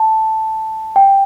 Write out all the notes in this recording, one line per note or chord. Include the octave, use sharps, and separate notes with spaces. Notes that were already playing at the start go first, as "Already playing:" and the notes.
Already playing: A5
G5